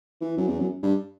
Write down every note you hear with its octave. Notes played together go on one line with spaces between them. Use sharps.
E3
F#2
E2
F#2
G2